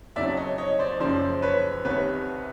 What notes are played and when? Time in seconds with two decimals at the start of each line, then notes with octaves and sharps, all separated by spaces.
0.16 G1 F2 C#3 F#3 D5 E5
0.37 C#5 D#5
0.58 C#5 D#5
0.79 C5 D5
1.00 F#1 F#2 C#3 F3 C5 D5
1.42 B4 C#5
1.85 C2 C3 D#3 B4 C#5